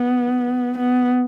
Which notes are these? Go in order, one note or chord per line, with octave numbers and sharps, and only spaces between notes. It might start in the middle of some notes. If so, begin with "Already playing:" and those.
Already playing: B3
B3